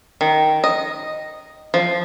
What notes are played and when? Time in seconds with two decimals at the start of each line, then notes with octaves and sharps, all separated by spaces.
0.21 D#3
0.64 D#5
1.74 F3